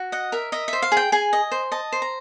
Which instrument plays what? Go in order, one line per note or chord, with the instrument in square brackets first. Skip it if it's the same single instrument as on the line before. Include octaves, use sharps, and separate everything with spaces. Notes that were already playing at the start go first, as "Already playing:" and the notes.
Already playing: [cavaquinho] F#4
D#5 F#5
A#4 E5
D#5 E5
C5 E5
F5
G#4
G5
G#4 G#5
D#5
C5
D#5 A5
C5
A#5